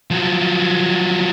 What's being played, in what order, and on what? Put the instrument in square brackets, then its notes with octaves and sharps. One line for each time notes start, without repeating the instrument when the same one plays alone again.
[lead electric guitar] F3 F#3